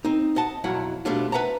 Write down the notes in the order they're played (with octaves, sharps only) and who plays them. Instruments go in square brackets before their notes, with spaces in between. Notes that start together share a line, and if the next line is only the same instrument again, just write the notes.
[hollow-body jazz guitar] C4 D#4
D#5 F#5 A5
B1 F2 F#3 E4 F#5
B2 G3 A3 D4 F4
B4 E5 F#5 A5 A#5